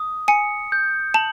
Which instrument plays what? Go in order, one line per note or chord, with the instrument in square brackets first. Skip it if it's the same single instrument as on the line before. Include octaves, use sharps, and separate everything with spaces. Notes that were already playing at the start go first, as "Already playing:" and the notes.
Already playing: [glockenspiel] D#6
[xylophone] G#5 [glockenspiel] C#7
[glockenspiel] G6
[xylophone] A5 [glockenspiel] F#7